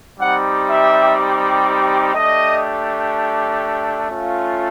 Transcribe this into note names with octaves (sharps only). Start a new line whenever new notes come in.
G3 C4 D#4 G4 F#5
E5
A3 D4 G4 D#5
A3 C#4 F4